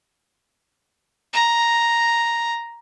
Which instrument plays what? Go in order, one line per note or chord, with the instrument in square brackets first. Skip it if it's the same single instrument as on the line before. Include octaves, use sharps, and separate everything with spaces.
[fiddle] A#5